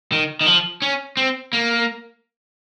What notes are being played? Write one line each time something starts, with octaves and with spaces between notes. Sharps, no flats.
D#3
D#3
F3
C#4
C4
A#3